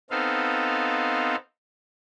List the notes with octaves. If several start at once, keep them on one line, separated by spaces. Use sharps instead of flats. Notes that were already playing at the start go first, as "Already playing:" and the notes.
B3 C4 D#4 A4 F5